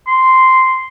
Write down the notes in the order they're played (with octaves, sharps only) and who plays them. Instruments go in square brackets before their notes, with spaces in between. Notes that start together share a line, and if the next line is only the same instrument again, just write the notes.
[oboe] C6